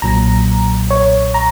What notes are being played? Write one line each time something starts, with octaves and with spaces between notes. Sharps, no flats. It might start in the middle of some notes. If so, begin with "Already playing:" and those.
B1 A#2 F#3 A#5
C#5
A#5